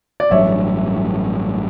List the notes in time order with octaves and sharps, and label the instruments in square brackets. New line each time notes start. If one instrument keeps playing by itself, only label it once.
[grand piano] D5
[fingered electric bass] A1 G2 F#3 [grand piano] C#5 E5